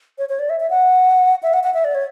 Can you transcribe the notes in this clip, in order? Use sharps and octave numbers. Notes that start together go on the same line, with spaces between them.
C#5
C#5
D5
E5
E5
F#5
E5
F#5
F#5
E5
D5
C#5